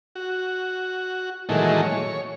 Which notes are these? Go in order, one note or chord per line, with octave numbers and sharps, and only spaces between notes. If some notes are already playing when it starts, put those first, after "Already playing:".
F#4
A#2 D#3 E3 F#3 G#3 A3
C#5